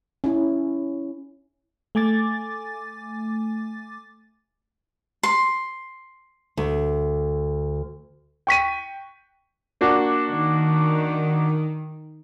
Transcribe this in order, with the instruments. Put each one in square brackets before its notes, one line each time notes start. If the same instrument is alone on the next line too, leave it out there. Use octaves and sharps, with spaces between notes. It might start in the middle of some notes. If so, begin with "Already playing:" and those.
[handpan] C#4 E4
[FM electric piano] A3 G#5 D6 A6
[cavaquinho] C6
[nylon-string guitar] D2
[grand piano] G5 C#6 B6 D#7
[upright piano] A#3 D4 F#4
[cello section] D#3